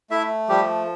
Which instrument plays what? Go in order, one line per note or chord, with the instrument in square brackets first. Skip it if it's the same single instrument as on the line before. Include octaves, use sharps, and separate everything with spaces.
[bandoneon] A3 E4 E5
F3 G3 G4